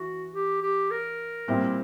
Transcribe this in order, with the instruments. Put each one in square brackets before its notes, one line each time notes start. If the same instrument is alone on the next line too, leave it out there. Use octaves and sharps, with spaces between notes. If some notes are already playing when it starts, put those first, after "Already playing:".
Already playing: [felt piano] E3 [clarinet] F#4
[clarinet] G4
G4
A#4
[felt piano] A#2 G3 C4 E4